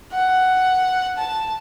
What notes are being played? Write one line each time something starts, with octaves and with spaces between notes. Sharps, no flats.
F#5
A5